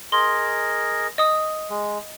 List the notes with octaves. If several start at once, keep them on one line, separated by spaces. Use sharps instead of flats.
G#4 A#4 D#5 C6
D#5 D#6
G#3